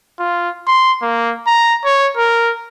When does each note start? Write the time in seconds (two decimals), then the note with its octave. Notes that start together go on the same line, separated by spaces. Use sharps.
0.19 F4
0.67 C6
1.02 A#3
1.47 A#5
1.84 C#5
2.17 A#4